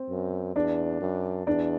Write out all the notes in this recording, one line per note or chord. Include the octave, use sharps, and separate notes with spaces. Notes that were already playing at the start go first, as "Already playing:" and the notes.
Already playing: C4
F#2
E2 D4 D5
F#2
E2 D4 D5